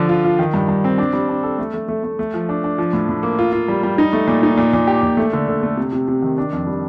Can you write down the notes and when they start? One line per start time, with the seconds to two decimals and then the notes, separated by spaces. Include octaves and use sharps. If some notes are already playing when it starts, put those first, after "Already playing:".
Already playing: D3 F3 D4
0.09 F4
0.25 F4
0.39 D#3
0.54 G2
0.69 G2
0.84 C4
0.98 D4
1.13 G3
1.29 D4
1.43 A4
1.59 A3
1.74 A3
1.88 A3
2.04 A3
2.19 A3
2.34 F3
2.49 D4
2.64 D4
2.78 F3
2.93 A2
3.09 A2
3.23 A#3
3.39 F4
3.53 F4
3.68 G3
3.83 G3
3.98 D#4
4.13 A3
4.27 A#2
4.43 D#4
4.57 A#2
4.73 A#2
4.87 G4
5.03 A#2
5.17 A3
5.33 D3
5.48 D3
5.63 A3
5.77 C3
5.93 C3
6.08 C3
6.22 D#3
6.38 D4
6.52 F2
6.67 G3